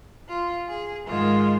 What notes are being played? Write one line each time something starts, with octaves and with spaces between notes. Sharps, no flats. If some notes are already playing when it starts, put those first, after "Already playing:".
F4
G#4
G#2 D#3 G#3 F4